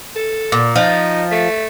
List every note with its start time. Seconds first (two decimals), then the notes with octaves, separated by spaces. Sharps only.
0.15 A4
0.52 A#2
0.76 F3 D#4
1.31 A3